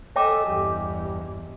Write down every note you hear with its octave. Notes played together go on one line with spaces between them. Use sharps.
A4 C#5 D#5 E5 G5 G#5 D6
E2 G2 G4